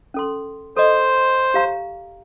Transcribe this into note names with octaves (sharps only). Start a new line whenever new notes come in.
C#4 A4 C6
A4 C5 D#5
G4 F5 A#5